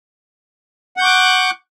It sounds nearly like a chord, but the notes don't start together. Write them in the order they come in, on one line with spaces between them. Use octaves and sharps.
F#5 G6 C#6 D6 F#6